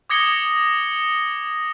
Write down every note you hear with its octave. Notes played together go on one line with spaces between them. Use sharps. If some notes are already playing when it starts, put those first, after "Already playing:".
D6 D#6 G#6 A#6 C#7 G7